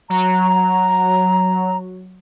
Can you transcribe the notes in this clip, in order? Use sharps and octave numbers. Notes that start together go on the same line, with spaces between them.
F#3 A#5